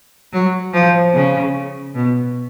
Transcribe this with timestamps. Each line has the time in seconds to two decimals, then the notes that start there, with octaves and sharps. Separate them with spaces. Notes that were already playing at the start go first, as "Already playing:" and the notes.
0.32 F#3
0.73 F3
1.14 C#3
1.95 B2